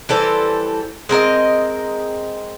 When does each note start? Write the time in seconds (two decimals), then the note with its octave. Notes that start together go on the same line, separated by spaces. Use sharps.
0.09 E3 G3 A4 C5
1.09 G#3 C4 A#4 D#5